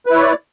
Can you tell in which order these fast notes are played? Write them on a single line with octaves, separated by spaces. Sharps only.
B4 E4 C#5 D5